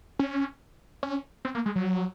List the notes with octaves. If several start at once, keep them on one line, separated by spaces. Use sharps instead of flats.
C#4
C#4
C4
A#3
G#3
F#3